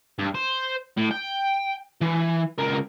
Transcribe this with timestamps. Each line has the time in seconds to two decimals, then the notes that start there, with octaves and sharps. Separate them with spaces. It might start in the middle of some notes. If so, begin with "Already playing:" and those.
0.19 G2
0.35 C5
0.97 A2
1.11 G5
2.02 E3
2.59 C#2 A#4